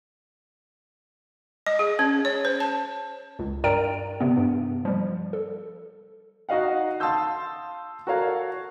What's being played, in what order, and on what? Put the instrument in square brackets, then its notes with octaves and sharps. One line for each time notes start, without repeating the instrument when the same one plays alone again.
[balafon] D#5
G#4
C#4
C#5
C5
A5
[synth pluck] C#2
G2 A#4 D5 G5 A#5 D7
C3 B3
G2
F3 G3
A4
[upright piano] D#4 F#4 D#5 F5 F#5
F5 A5 C6 D#6 E6 G6
F#4 A4 A#4 C#5 F5